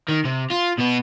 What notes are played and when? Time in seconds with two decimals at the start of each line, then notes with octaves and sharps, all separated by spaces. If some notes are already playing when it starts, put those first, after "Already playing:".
0.08 D#3
0.25 C3
0.50 F4
0.78 B2 B3